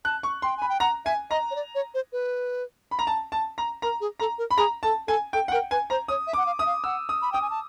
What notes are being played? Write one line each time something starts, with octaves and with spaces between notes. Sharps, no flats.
A5 F#6
C#6
G5 C6
G#5 B5
G5
F#5 A#5
E5 G#5
D#5 A#5
C#5
D5
C#5
C5
B4
B5
A#5
A5
A5
A#5
A#4 A#5
G#4
A4 A#5
A#4
B5
G#4 A#5
A4 A5
A4 G#5
A4 G5
F#5
A#4 G5
B4 G#5
C5 A#5
C#5 D#6
E5
D6
F#5
F5
E5 D#6
F5
F#5 E6
D#6
B5
G5 D#6
G#5
A5